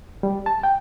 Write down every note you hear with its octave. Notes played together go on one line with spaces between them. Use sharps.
G3
A5
G5